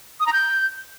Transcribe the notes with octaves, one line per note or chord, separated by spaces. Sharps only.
D#6
A#5
G6